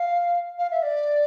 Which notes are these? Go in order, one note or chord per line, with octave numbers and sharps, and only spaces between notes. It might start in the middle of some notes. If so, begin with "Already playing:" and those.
Already playing: F5
F5
E5
D5